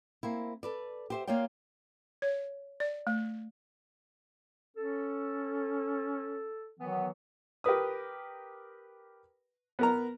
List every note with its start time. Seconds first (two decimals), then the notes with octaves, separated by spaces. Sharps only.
0.23 A#3 C4 E4
0.63 A4 B4 D5
1.10 G4 C5 E5
1.27 A#3 F4 C#5 D5 G5
2.22 C#5
2.80 D5
3.07 A3
4.77 C#4 A4
6.80 D#3 E3 F#3 B3
7.64 G4 A#4 B4 D#6
9.79 B3 A#4 A#5